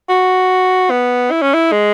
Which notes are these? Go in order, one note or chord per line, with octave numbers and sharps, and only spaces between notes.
F#4
B3
E4
C#4
E4
G#3